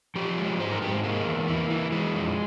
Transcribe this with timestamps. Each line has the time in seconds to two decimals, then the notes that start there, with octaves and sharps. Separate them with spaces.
0.16 F3 G4
0.38 G#3
0.60 G#2 C5
0.71 A#4
0.82 G#2 G4
0.93 C4
1.04 G#3 A#3
1.26 E2
1.48 E3
1.70 E3
1.92 E3 G#3
2.15 F2